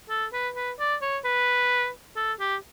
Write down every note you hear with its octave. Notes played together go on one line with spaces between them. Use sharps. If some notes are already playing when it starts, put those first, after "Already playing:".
A4
B4
B4
D5
C#5
B4
A4
G4